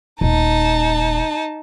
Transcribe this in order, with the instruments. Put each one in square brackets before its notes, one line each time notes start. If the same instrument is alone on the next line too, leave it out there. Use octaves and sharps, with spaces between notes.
[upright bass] D#1 [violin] D#4 A5